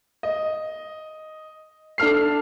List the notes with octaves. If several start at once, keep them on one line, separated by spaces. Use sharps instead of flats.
D#5
D4 A4 F6 C7